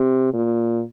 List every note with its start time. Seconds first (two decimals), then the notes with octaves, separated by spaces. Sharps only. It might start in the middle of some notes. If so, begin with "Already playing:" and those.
Already playing: C3
0.34 A#2